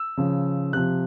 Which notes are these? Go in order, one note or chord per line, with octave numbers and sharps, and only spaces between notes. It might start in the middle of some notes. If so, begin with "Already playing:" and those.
Already playing: E6
C#3 F3
C3 F3 F#6